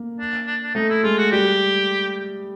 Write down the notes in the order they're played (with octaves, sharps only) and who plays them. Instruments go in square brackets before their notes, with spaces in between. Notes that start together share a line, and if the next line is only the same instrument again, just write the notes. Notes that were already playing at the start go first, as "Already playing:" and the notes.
Already playing: [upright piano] A#3
[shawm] D4
D4
D4
[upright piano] A3 [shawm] D#4
[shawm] E4
[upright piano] G#3 [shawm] F4
[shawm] F#4
[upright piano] G3 [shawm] G4